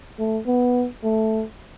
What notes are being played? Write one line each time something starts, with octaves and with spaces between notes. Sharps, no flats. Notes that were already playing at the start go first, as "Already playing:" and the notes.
A3
B3
A3